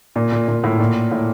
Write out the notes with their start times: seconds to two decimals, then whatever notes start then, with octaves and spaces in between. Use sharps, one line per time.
0.16 A#2
0.32 A#2
0.48 A#2
0.64 A2
0.79 A#2
1.11 A2